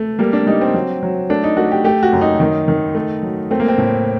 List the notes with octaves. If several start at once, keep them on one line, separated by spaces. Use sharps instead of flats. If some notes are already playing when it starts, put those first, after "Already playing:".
Already playing: A3
G3 A#3
D4
G3 D#4
C4
F#3
F#3
A3 D4
D#4
A3 F#4
G4
A3 G4
F#4
F#2
D#4
D#3
D#3
A3
F#3
A3 C4
A#3
C4
A2